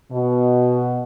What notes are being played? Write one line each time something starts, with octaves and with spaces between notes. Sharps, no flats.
B2